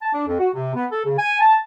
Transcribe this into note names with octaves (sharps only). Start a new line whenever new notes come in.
A5
D4
F2
F#4
C3
B3
A4
C#3
G#5
A5